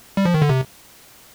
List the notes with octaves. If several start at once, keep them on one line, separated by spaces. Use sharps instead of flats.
G3
F3
D#3
D3
C3